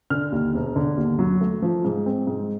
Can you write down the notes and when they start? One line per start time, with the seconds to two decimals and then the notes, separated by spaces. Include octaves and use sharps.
0.10 D3 F6
0.32 D#2
0.54 E1
0.76 D3
0.97 D#2
1.19 F#3
1.41 A3
1.62 F3
1.85 G#2
2.06 C4
2.27 G#2